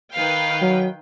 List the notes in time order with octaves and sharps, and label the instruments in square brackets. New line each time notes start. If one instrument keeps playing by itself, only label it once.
[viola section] D#3 B4 G5 [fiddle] F5
[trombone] F#3